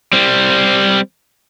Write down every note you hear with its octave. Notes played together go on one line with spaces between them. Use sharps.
G3 C4